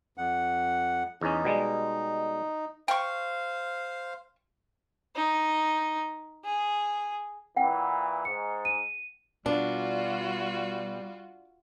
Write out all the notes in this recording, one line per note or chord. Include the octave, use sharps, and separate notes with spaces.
F2 F#5
E2 C#4 D#4
B2 G3 G#3
C5 F5 G5 C#6
D#4
G#4
A#2 E3 F#5 G5
G#2 C#7
D#7
B2 G3 D4 F4 F#4